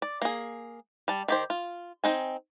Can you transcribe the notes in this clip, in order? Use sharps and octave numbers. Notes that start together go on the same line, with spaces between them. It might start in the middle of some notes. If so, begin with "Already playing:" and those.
D5
A#3 G#4
G3 A5
D#3 G4 C5
F4
C4 D#4 G#5